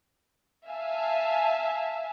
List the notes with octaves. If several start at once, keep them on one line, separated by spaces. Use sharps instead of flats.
E5 F5 G#5 A5